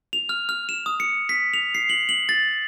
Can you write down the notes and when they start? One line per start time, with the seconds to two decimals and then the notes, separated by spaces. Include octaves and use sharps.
0.13 F7
0.29 F6
0.49 F6
0.69 E7
0.86 D#6
1.00 C#7
1.29 B6
1.54 F7
1.75 C7
1.89 F#7
2.09 F#7
2.29 A6